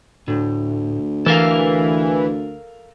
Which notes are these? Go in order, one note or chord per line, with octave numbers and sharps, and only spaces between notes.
D2 A2
E3 A4 A#4 F5